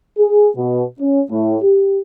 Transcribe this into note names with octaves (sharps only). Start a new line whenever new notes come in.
G#4
B2
C#4
A2
G4